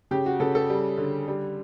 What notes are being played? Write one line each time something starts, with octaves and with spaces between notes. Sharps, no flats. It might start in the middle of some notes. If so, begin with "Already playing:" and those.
C#3 G4
F#4
C#3 A4
A4
G3
D3
G3